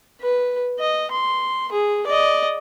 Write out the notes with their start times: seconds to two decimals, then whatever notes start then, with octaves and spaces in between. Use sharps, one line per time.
0.21 B4
0.80 D#5
1.11 C6
1.72 G#4
2.07 D5 D#5